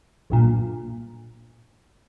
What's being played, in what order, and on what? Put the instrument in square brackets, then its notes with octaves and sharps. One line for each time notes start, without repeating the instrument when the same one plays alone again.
[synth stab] B1 G2 A#2